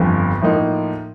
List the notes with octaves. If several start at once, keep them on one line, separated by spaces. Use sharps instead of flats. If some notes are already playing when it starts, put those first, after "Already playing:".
Already playing: G1 F2 D3 F3
A2 F3 A#3 D#4